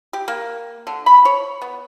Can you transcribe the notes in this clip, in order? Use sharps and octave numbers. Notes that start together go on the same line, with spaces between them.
G4
A#3
D3
B5
C#5
B3